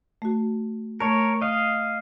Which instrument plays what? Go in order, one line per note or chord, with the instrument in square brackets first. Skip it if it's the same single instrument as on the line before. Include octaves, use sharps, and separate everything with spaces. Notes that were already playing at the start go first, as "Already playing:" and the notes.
[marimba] A3 F#4
[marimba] A3 A5 [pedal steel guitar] A#4 C#5
[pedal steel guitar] D#5 F5